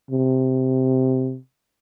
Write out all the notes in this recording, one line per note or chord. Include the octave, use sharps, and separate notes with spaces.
C3